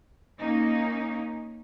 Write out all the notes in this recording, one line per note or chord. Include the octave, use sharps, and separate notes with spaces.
A#3 C#4 D#4